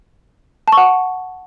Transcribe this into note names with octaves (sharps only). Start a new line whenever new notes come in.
F#5 A5 C#6